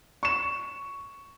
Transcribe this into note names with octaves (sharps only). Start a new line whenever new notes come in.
C#6 E7